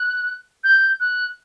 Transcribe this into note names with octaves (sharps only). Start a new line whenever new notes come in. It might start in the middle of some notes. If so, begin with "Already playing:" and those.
Already playing: F#6
G6
F#6